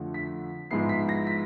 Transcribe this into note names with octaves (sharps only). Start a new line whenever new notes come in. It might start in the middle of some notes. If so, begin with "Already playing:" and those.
Already playing: F2 D3 F3 A3
B6
G#2 F3 G#3 B3 E4 C7
B6
A#6
B6